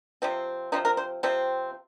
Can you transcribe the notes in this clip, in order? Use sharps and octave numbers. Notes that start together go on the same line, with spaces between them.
C3 F3 C4
C3 F3 C4 D#4
A#4
C5
C3 F3 C4